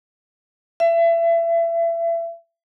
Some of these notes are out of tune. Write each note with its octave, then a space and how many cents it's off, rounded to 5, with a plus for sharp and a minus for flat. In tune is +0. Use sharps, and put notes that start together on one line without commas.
E5 +30